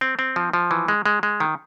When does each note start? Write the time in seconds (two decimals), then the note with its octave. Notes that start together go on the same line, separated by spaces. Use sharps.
0.01 C4
0.19 C4
0.36 F3
0.53 F3
0.71 E3
0.88 G#3
1.06 G#3
1.23 G#3
1.40 D#3